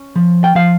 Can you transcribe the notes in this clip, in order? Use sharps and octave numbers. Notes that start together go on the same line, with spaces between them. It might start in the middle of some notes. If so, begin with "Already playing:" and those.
Already playing: C#4
F3
G5
F3 F5